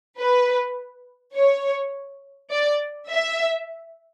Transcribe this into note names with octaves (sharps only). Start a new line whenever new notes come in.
B4
C#5
D5
E5